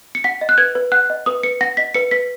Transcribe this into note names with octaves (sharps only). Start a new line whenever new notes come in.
C#7
F#5 B6
D#5
F#6
B4 G#6
B4
F#5 F#6
D#5
B4 D#6
B4 C#7
F#5 A#6
D#5 B6
B4 C#7
B4 B6